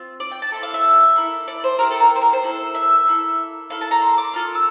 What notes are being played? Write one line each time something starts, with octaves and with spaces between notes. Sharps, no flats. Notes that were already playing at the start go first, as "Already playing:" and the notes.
Already playing: C4 F4
D5
G5
A5
C4 E4 A4
F5
E5
A#3 E4 A4
D5
C5
A3 E4 G4 A#4
A4
A#4
C5
A#4
C5
A#3 E4 A4
E5
A#3 E4 A4
A#3 E4 A4 F5
A5
A#5
C6
D6
A#3 F4 A4 F6
E6